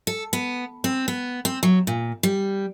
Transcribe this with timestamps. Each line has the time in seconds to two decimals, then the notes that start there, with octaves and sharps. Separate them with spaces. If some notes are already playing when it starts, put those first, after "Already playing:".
0.07 A4
0.33 B3
0.84 C4
1.08 B3
1.45 C4
1.63 F#3
1.87 A#2
2.23 G3